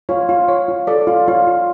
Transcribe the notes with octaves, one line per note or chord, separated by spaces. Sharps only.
F4 C#5
F4
C#5
F4
A4 D5
F4
F4 C#5
F4